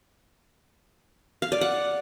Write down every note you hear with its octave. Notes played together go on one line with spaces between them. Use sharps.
F5
D5
F#5